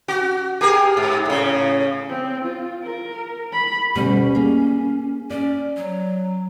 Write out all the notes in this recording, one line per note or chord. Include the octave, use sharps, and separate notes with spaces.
F#4
G4 G#4 A#4
G#2
A2 C#3
C4
F4
A#4
B5
D2 B2 G3 C#4
A#3 G#4
C#4 D5
F#3